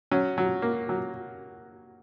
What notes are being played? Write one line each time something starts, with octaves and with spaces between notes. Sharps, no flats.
F#3 C#4
F#3
A#3
F#3